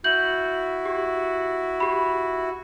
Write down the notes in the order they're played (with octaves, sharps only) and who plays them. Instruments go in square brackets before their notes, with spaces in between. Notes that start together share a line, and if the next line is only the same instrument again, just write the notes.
[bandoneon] E4 F#4 [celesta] G6 F#7
[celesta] G4
G4 B5